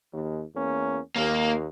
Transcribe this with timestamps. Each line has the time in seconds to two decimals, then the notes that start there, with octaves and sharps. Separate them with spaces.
0.12 D#2
0.55 E2 A#3 C#4
1.16 D#2 A#3